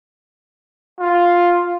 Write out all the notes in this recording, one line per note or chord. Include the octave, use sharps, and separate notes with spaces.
F4